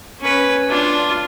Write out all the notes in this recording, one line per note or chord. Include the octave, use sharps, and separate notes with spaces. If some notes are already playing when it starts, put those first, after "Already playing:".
C#4 B4
D4 F4